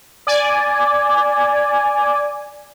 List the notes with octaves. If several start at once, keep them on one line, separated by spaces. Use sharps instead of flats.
D5 G#5